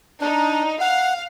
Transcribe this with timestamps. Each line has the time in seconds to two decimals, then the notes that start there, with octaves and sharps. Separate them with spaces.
0.21 D4 D#4
0.81 F5 F#5